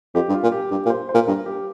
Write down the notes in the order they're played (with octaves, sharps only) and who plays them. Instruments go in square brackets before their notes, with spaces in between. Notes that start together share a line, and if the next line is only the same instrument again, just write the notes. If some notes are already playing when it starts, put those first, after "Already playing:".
[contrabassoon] F2 [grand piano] G4
[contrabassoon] G2
[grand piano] F4
[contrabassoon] A#2
[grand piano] G4
[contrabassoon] G2 [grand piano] G4
[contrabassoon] A#2
[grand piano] C5
C5
[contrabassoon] A#2
[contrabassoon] G2 [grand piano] A#4
[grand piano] G4